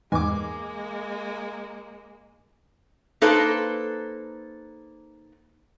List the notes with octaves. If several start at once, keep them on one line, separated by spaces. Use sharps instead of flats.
E2 G#2 G#3 A#3 G#5 D6
A#3 D#4 A4 B4 C5